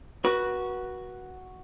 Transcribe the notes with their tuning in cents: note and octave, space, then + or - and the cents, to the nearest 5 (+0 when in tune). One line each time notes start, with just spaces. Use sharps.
F#4 +0 B4 -35